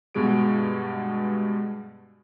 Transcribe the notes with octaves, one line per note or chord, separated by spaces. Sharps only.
G2 B2 G#3 F#4 G#4 D7